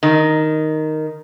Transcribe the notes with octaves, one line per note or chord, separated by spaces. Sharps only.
D#3